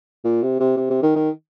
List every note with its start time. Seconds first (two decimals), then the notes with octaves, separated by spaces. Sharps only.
0.24 A#2
0.42 C3
0.60 C3
0.77 C3
0.90 C3
1.03 D#3
1.16 D#3